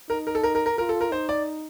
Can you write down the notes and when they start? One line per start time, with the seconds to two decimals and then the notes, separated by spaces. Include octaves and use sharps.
0.09 D#4 A#4
0.27 A#4
0.35 A4
0.43 A#4
0.55 A#4
0.66 A#4
0.77 F4 A#4
0.89 A4
1.01 A#4
1.12 D#4 C5
1.29 D5